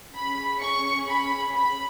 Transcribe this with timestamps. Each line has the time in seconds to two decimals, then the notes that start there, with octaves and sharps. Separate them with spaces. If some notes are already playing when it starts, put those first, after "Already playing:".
0.14 C#4 G#4 B5
0.61 C#6
1.08 B5
1.53 B5